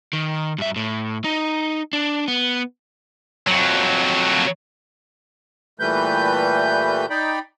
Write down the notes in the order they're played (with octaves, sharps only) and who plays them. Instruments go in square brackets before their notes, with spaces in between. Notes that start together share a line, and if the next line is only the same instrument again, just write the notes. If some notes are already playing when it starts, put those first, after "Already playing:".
[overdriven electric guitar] D#3
G2 E5
A2
D#4
D4
B3
[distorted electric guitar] F2 F#3
[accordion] A#2 E3 G3 A3 B4 G6
D#4 D5 G5 B5